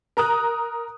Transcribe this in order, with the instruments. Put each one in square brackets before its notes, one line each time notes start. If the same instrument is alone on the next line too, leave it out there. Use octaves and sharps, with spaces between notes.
[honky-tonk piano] A#4 A#5 D#6 F#6